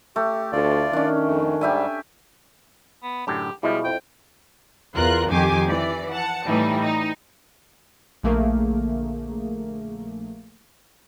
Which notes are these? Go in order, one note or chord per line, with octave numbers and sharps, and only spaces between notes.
A3 G4
D2 F4 D5
D#3 C#4 D4
F2 A3
G#2 G3 G4 E5 G#5
B3
F#2 A2 D3 G4
B2 F3 G3 G#3 E4 D#5 E5
F2 G5
E2 F4 A#4 F#6
F2 D#3 G4 G#5 D6 C7
E3 D5
F#5 A5 C#7
A2 E3 G3 D#4
D#4
A#1 D3 A3 A#3 G#4 A#4